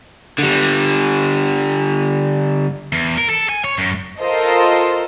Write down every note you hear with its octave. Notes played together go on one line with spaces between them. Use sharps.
D3 G3
E2
A#4
A4
G#5
C#5
F#2
F4 A4 A#4 C5 D#5